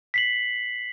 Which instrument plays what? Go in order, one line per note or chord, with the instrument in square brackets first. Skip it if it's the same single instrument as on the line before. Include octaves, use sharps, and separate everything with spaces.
[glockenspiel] B6 C7 F#7